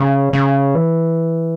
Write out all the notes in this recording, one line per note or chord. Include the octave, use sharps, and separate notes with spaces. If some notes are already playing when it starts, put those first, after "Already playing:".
Already playing: C#3
C#3
E3